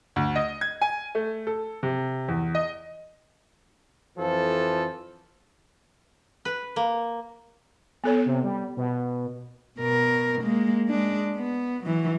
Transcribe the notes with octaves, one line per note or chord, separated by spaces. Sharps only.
D2
D#5
G#6
G#5
A3
A4
C3
E2
D#5
F2 E3 F3 A4
B4
A#3
B3 A4 C#5
C3
G3
B2
B2 A#4
G#3 A#3
G#3 D4
B3
E3 F#3